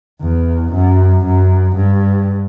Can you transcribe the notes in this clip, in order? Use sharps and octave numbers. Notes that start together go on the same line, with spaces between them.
E2
F#2
F#2
G2